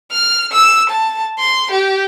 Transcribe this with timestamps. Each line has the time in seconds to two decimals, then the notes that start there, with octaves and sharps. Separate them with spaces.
0.12 F6
0.52 E6
0.90 A5
1.39 C6
1.71 G4